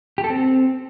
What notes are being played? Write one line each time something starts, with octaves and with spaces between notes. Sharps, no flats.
G4
A4
C4